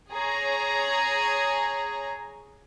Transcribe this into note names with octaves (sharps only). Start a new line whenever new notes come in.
G#4 C#5 A#5